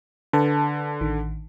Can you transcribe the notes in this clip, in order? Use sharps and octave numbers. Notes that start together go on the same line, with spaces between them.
D3 B4 A5
A1 D#3